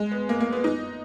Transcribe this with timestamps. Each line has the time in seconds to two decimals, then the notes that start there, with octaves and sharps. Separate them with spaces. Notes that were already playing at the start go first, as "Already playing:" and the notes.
Already playing: G#3
0.11 B3
0.29 A#3
0.40 A#3
0.53 B3
0.64 D#4